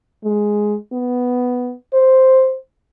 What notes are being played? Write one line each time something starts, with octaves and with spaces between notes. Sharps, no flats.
G#3
B3
C5